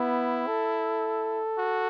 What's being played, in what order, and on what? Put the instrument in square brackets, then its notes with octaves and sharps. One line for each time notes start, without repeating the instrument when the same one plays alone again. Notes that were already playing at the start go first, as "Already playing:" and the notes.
Already playing: [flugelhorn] B3 [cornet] E4
[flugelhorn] A4
[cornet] F#4